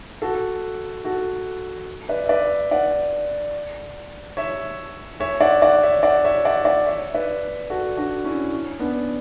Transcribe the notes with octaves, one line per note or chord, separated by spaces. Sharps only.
F#4 A4
F#4 A4
B4 D5
E5
B4 D5
D5 F#5
C#5 E5
C#5 E5
D5 F#5
D5 F#5
C#5 E5
D5 F#5
C#5 E5
D5 F#5
D5 F#5
C#5 E5
B4 D5
F#4 A4
D4 F#4
C#4 E4
C#4
B3 D4